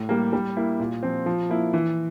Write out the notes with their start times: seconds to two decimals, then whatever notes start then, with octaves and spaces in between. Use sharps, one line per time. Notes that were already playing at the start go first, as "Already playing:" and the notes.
Already playing: A2
0.09 G3 A#3
0.33 G3
0.57 A#3 E4
0.80 A#2
1.03 F3 C4
1.26 F3
1.50 A#3 E4
1.73 E3